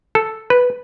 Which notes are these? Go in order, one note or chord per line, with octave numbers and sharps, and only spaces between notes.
A4
B4